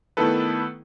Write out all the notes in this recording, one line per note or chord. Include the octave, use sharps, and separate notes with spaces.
D#3 A3 B3 E4 A4 B4